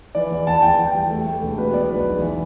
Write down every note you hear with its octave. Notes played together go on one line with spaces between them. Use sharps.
E3 D5
E2
E2 A5
E2 G5
E2
G5
G3
A3
A3
E1
B2 B4
B3 D5
B1 B4
E2
E3